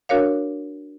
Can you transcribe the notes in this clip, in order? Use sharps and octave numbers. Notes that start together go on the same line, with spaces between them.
D4 F#4 A#4 C#5 F5